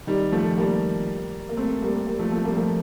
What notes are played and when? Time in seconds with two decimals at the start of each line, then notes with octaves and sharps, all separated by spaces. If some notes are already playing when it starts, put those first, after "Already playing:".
0.07 D#3 G3
0.32 F3 A3
0.58 G3 A#3
1.49 A#3
1.57 A3 C4
1.82 G3 A#3
2.07 G3 A#3
2.19 F3 A3
2.32 F3 A3
2.45 G3 A#3
2.57 F3 A3